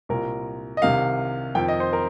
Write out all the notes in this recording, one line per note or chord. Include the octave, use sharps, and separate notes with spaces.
C2 A#2 A#4
D#5
C2 C3 D#3 F5
F2 D#3 G5
D#5
C5
A#4